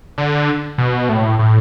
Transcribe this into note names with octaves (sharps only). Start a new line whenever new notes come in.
D3
B2
A2
A2